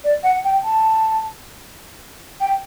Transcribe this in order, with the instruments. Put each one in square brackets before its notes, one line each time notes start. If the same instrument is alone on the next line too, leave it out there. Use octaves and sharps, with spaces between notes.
[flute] D5
F#5
G5
A5
G5